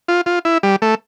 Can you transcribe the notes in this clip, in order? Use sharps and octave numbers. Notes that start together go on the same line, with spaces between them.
F4
F4
E4
G3
A3